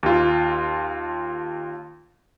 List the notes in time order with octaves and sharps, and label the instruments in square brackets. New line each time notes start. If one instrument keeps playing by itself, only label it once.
[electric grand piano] D#2 F4